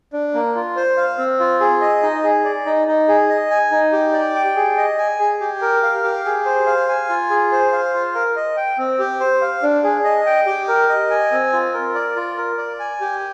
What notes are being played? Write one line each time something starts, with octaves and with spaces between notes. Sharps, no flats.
D4
A#3
F4
C5
F5
C4
F4
G#4
D#5
D#4
G#4
D5
D#4
D#4
G#4
D#5
G#5
D#4
G4
D5
G5
G#4
D#5
G#5
G#4
G4
A#4
F5
G4
G#4
C5
F5
G#5
F4
G#4
C5
F5
F4
A#4
D#5
G5
C4
G4
C5
F5
D4
G#4
D#5
G5
G4
A#4
D#5
G#5
C4
F4
A#4
D5
F4
A#4
D5
G#5
G4